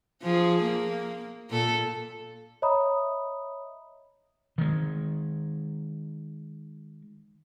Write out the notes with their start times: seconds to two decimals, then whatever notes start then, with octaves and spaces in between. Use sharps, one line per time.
0.22 F3 G#4
0.63 A#3
1.50 A#2 A4
2.62 C#5 D#5 E5 A#5 B5 D#6
4.58 D#3 G#3